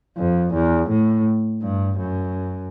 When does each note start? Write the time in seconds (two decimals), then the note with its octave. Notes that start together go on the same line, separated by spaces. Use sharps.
0.18 F2
0.54 E2
0.90 A2
1.62 G2
1.99 F#2